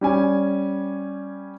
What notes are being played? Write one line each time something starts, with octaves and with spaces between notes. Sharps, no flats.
G3 C#4 G#5